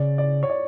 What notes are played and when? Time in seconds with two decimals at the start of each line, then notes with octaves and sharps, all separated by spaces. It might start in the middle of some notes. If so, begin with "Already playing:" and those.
Already playing: C#3 D5
0.18 D5
0.43 C#5
0.50 D5